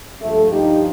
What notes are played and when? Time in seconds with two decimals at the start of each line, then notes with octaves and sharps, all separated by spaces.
0.21 G2 F3 A3
0.51 D#4 G4